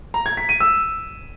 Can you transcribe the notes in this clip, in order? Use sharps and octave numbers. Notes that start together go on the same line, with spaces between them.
A#5
G#6
B6
D#7
E6